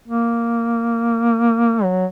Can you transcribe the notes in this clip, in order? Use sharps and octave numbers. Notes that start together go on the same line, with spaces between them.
A#3
F#3